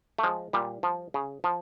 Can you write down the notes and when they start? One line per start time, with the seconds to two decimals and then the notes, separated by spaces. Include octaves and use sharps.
0.19 A3
0.23 F3 G#3
0.53 A#2 G3
0.83 F3
1.14 C#3
1.44 F3